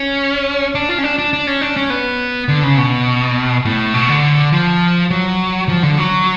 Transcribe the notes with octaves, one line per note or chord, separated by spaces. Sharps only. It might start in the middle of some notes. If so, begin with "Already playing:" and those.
Already playing: C#4
D4
F4
C#4
D4
D4
D4
C#4
D4
C#4
B3
D3
C#3
B2
A2
B2
D3
F3
F#3
F3
D3
F#3